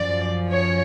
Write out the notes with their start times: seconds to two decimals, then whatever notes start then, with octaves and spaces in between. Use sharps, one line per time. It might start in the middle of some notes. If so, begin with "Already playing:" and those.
Already playing: F#2 F3 D5
0.51 C#5